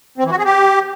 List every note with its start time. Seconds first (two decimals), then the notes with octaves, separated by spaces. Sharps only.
0.18 C4
0.25 E3
0.31 F#4
0.38 G#4
0.45 G4